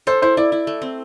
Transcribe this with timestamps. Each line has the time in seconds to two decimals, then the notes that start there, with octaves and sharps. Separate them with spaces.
0.07 A4 C5
0.22 E4 C5
0.37 E4 D5
0.52 E4
0.67 A3
0.82 C4